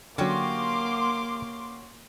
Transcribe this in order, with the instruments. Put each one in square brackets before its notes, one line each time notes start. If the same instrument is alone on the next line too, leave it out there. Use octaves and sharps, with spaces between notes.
[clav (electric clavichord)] D3 F#3 [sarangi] A#3 [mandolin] C#4 F#4 G4 [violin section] C6 D6